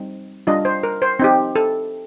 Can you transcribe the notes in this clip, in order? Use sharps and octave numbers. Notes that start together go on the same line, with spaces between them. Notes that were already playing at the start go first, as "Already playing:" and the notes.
Already playing: G3 C4 D#4
G3 D4 F4 D#5
C5
A#4
C5
C4 D#4 G4
A4